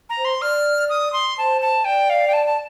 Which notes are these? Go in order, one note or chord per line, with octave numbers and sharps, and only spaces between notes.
A#5
C5
C6
D5 F6
D#6
C6
C5 A5
A5
D5 G5
F5
G5
A5
A5